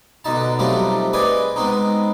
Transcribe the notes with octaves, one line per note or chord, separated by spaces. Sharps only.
B2 D3 D#4 A5
F#3 G3 A3 C4 D#4 F4
G#4 B4 D5 D#5 G5 G#5
G#3 B3 C4 D#4